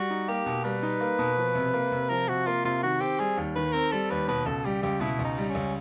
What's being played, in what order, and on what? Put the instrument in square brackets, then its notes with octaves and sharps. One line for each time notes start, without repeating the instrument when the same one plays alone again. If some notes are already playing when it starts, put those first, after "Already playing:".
Already playing: [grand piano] G3 [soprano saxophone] F#4
[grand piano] D#4
[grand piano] A#3 [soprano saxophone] G4
[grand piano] B2
[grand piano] G3 [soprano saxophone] B4
[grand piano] D#4
A#3
B2
F3
C3
A#3
C3
[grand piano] F3 [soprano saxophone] A#4
[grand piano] C3 [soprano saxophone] F#4
[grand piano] A#3 [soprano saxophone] F4
[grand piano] C3 [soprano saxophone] F4
[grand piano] D#3 [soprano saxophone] F#4
[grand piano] C4 [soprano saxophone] G4
[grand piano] G3 [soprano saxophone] G#4
[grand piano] D#2
[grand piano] D#3 [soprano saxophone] B4
[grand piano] C4 [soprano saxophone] A#4
[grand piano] G3 [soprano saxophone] A4
[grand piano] D#2 [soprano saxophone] B4
[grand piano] B2 [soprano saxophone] B4
[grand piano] C#2 [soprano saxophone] A4
[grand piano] G3 [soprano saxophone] G4
[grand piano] C#2 [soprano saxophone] G4
[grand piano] B2 [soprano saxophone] E4
[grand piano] C#2
[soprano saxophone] D#4
[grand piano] G3
[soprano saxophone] C#4
[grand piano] C#2